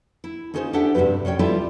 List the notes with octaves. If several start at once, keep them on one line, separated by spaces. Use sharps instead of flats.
E4
C#4 D#4 F4 G#4 A#4 C5
D4 G4 A4 E5 F#5
G2 C3 G3 G#3 B4
F#2 C#4 C#5 G5
G3 E4 F4 G4 A4